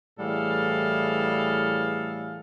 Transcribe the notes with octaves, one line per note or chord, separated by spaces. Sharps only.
A2 E3 G3 G#4 A4 F5